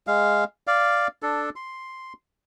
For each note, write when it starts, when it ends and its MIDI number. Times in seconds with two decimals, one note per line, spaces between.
0.07 0.44 56
0.07 0.44 77
0.67 1.08 74
0.67 1.08 77
1.23 1.50 62
1.23 1.50 69
1.56 2.13 84